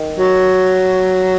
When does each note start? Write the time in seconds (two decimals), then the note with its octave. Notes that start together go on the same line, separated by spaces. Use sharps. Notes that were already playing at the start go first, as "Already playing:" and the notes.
Already playing: D#3
0.18 F#3